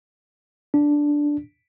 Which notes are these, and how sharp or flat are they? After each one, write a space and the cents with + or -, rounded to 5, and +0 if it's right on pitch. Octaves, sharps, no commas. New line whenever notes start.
D4 -5